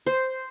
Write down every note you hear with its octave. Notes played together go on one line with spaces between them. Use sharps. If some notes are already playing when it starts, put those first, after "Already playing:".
C5